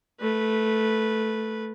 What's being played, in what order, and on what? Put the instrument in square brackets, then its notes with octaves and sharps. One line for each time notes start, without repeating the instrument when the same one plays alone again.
[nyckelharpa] A3 B4